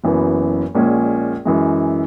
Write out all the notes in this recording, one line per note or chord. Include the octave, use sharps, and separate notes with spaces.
F#1 F#2 E3 B3
A#1 A#2 G#3 C#4
F#2 E3 G#3